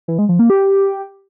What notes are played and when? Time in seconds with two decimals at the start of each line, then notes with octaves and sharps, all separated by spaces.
0.08 E3
0.18 G#3
0.29 F3
0.39 A#3
0.50 G4